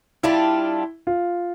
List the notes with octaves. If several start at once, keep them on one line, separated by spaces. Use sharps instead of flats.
G3 D4 E4 F4
F4